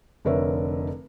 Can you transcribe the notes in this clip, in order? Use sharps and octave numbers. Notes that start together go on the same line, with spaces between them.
F1 D3 A#4 B4 C#5 E5